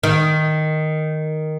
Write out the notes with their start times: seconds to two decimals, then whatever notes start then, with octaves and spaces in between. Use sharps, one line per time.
0.03 D#3